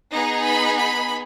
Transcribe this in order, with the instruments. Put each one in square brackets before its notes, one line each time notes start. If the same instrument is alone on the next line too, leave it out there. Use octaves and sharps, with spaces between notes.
[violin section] B3 D#4 G#4 A#5
B5
B5